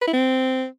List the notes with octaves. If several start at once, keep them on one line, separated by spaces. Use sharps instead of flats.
B4
E4
C4